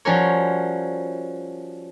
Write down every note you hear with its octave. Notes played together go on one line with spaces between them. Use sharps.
F3 G3 C#4 F#4 A#4 C#5